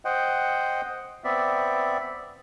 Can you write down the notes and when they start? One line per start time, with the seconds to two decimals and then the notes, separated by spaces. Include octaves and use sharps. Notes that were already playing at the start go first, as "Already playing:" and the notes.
0.05 C5 D#5 F#5 G5
1.24 B3 C4 D5 E5